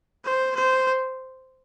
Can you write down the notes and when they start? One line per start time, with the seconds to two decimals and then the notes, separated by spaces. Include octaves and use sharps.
0.24 C5
0.55 C5